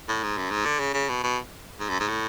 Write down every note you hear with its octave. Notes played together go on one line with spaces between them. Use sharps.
A2
G#2
F#2
G#2
D3
C#3
C#3
B2
B2
G#2
F#2
G#2
A2